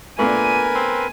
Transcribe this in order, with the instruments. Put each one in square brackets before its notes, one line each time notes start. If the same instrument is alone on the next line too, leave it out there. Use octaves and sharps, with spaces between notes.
[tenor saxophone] A#2 [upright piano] A3 B3 D4 [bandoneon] A#4 B4 [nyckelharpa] G#5
[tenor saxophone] C4